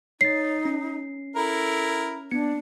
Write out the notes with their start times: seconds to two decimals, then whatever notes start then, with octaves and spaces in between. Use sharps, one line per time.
0.21 D#4 C#5 A6 C7
0.65 C#4
1.36 E4 A4 A#4
2.31 B3 D4 C#7